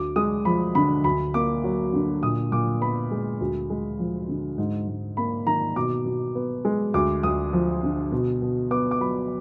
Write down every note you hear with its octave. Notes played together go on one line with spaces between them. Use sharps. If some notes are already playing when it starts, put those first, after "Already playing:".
Already playing: D2 D6
G#3 D#6
F3 B5
D3 B5
D2 B5
A#3 D6
F#3
D3
A#2 D#6
A#2 D6
B3 B5
G#3
D2
G#3
F3
D3
G#2
G#2
A#3 B5
D#3 A#5
B2 D6
B2
B3
G#3
D2 D6
D2 D#6
F3
D3
B2
B2
B3 D6
D6
F#3 B5